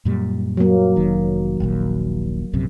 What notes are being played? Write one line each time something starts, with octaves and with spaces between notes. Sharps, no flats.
F#2 A#2 G3
F#3 A#3
F1 D#3
D#1 A#1 D#2
A#1 F#2 C3